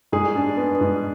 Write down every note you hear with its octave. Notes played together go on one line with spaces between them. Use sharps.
G#2 G#4
D4
B3
G#2